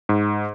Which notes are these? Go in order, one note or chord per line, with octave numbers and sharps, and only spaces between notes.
G#2